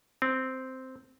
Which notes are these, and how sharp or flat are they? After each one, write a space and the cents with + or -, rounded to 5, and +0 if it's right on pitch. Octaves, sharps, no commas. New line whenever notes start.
C4 -5